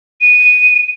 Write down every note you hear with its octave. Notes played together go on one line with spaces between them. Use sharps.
D#7